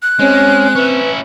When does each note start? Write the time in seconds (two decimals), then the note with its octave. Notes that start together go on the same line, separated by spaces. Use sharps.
0.03 F#6
0.19 G#3 C4 C#4
0.75 C#4 E4 B4